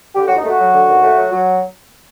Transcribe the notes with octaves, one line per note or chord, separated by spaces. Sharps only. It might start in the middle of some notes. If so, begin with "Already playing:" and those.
D3 G4
D#2 F#4
D#4
A3 F#4
F#3
D3
D#2
A3
F#3
F#3